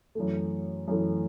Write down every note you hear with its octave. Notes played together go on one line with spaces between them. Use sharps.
F#2 E3 A3
F#2 E3 A3